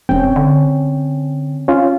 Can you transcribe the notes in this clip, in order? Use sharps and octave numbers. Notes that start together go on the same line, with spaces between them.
E1 C4 C#4 G5
D3
C#4 F4